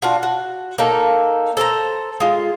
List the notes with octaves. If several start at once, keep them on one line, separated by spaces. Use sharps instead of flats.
D4 F4 F#4
F#4
A#3 D#4 A4
A4 C5 A5 A#5
G#3 F4